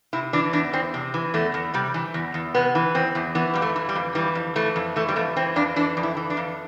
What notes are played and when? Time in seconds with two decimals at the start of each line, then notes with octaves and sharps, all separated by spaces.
0.13 C3 E4
0.33 E3 D4
0.53 E2 D4
0.73 E2 C4
0.94 C3
1.14 E3
1.34 E2 A3
1.54 E2
1.74 C3 G3
1.94 E3
2.14 E2
2.34 E2
2.54 C3 B3
2.75 E3
2.94 E2 C4
3.15 E2
3.35 E3 B3
3.54 F2 G3
3.62 A3
3.76 E3
3.89 G3
3.95 F2
4.15 E3 G3
4.35 F2
4.56 E3 A3
4.76 F2
4.96 E3 A3
5.08 G3
5.16 F2 A3
5.36 E3 C4
5.56 F2 D4
5.76 E3 D4
5.97 F2
6.03 E4
6.17 E3
6.30 D4
6.37 F2